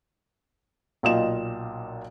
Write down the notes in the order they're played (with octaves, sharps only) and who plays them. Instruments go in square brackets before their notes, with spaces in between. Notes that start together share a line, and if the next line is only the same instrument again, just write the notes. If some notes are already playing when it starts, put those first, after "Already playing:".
[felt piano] B1 A#2 F4 D#5 G5 E7